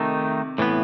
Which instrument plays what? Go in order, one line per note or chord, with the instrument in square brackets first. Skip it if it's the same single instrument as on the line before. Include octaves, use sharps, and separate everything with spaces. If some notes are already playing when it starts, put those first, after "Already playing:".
Already playing: [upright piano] C3 [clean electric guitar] D#3 A3 D#4
[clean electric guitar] A2 E3 B3